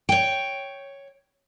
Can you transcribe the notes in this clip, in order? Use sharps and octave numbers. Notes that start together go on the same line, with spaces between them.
C#5 G5